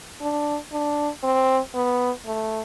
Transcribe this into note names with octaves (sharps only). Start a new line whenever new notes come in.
D4
D4
C4
B3
A3